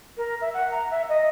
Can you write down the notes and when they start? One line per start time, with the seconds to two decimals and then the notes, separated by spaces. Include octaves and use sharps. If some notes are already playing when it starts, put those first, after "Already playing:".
0.17 A#4
0.41 E5
0.54 F#5
0.71 A#5
0.91 E5
1.09 D#5